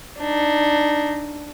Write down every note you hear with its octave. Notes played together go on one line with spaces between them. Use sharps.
D4 D#4